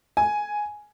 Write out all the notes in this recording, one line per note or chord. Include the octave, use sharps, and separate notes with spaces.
G#5